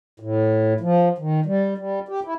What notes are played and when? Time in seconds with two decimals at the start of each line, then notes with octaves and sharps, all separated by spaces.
0.20 A2
0.81 F3
1.18 D#3
1.46 G3
1.78 G3
2.09 G4
2.25 E4